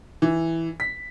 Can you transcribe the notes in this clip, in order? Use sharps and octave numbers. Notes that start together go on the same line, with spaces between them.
E3
B6